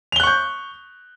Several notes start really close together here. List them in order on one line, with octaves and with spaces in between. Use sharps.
F7 G7 F#6 C#6 G6